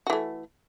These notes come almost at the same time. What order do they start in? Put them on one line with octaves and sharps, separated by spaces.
F#4 E3 A3